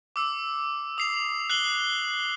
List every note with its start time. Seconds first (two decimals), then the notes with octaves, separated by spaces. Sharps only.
0.16 D6 E6
0.98 D#6 C7 F7
1.50 F#6 C7 F#7 G7